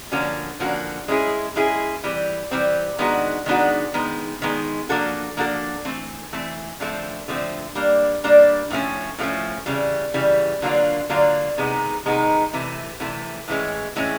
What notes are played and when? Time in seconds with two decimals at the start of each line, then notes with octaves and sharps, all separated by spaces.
0.12 D3 F3 A#3 C#4 F#4
0.60 D3 F3 A#3 C#4 F#4
1.08 G#3 C#4 E4 G#4
1.56 G#3 C#4 E4 G#4
2.04 E3 G3 C4
2.51 E3 G3 C4
2.98 D#3 G#3 B3 D4 F#4
3.46 D#3 G#3 B3 D4 F#4
3.94 D#3 G#3 B3
4.42 D#3 G#3 B3
4.89 F3 A#3 D4 F#4 A4
5.37 F3 A#3 D4 F#4 A4
5.85 E3 A3 C4
6.33 E3 A3 C4
6.80 D3 F3 A3 C4
7.28 D3 F3 A3 C4
7.75 G3 A#3 D4
8.24 G3 A#3 D4
8.70 A2 F3 A3 C#4
9.18 A2 F3 A3 C#4
9.66 C#3 E3 G3
10.14 C#3 E3 G3
10.62 D3 F#3 A#3 D4 F4
11.09 D3 F#3 A#3 D4 F4
11.57 C3 D#3 G#3 B3 D#4
12.05 C3 D#3 G#3 B3 D#4
12.53 C3 E3 A3
13.00 C3 E3 A3
13.48 A2 E3 G#3 C#4
13.96 A2 E3 G#3 C#4